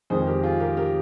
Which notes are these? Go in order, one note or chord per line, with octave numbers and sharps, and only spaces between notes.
F2 D#3 G#3 C4 G#4 C5
G4 A#4
F4 G#4
G4 A#4
G4 A#4